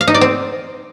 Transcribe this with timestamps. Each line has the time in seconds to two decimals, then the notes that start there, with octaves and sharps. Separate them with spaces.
0.01 F5
0.08 D#4
0.14 D5
0.21 C4